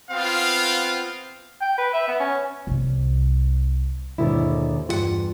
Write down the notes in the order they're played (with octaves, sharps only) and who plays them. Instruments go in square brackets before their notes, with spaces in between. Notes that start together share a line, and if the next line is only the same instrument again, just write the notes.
[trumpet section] B3 C4 F4 F5
[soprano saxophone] G5
B4
E5
B3
C#4
[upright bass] C2 C3
[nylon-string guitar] D#2 G#2 B2 D3 B3 E4
E2 G2 F4 G4 F#5